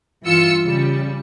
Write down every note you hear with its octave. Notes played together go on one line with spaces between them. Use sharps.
G2 E3 F4 E6 C#7
C#3 G3